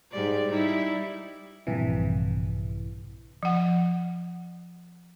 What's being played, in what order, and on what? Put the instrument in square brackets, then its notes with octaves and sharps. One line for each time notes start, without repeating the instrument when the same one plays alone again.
[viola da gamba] G#2 G3 D5
G3 D#4 E4
[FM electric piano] A#1 G2 C3 E3
[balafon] F3 F#5